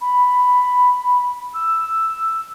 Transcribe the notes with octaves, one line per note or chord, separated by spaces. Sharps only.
B5
E6